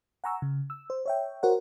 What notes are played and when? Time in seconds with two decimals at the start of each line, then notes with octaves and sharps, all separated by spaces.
0.24 F#5 G#5 A#5 C#6 E6
0.42 C#3
0.70 E6
0.90 C5
1.06 C#5 E5 G5
1.43 F#4 A#4 C5 C#5 F#5